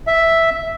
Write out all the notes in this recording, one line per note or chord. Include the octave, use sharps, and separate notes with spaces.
E5